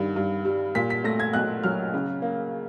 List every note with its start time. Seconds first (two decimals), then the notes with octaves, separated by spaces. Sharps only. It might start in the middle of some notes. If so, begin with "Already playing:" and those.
Already playing: G2 D#3
0.16 G2
0.45 G3
0.75 A#2 B6
0.90 B6
1.04 A3 A#6
1.20 G#6
1.33 B1 F#6
1.64 F#3 F6
1.94 C#3
2.22 A#3